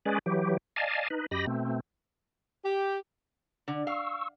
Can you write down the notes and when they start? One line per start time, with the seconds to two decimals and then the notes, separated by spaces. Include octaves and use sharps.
0.06 G#3 C#4 G#4 B4 D5
0.26 E3 F#3 G4
0.76 D5 D#5 F5 G#5 A5
1.10 D#4 B4
1.31 F#2 G4 D#5 B5 A#6
1.47 B2 A3 C4
2.65 G4
3.68 D3
3.87 F5 C#6 E6